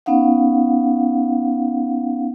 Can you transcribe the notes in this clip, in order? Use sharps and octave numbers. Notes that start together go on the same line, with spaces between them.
B3 C#4 D#4 F5 F#5